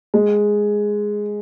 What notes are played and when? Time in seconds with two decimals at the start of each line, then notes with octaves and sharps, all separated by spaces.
0.14 G#3